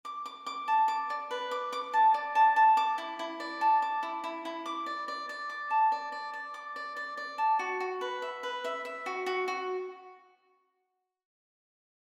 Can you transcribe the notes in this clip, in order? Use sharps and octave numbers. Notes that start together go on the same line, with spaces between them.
D6
D6
D6
A5
D6
D5
B4
D6
D6
A5
D5
A5
A5
D6
E4
E4
D5
A5
D6
E4
E4
E4
D6
D5
D5
D5
D6
A5
D5
D5
D5
D6
D5
D5
D5
A5
F#4
F#4
B4
E5
B4
E5
E5
F#4
F#4
F#4